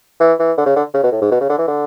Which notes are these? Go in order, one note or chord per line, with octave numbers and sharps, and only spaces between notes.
E3
E3
D3
C#3
D3
C#3
B2
A2
G#2
B2
C#3
D3
E3
D3